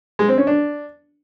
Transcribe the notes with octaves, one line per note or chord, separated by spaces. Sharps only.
G#3
C4
C#4
D4